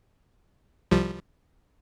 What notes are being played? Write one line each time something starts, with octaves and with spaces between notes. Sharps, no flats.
C2 F3 G3